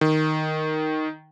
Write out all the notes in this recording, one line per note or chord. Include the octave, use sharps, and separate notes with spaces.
D#3